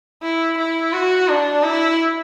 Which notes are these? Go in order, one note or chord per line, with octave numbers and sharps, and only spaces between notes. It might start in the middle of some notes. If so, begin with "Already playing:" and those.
E4
E4
F#4
D4
E4